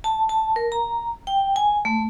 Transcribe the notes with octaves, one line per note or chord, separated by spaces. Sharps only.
A5
A5
A#4
A#5
G5
G#5
A3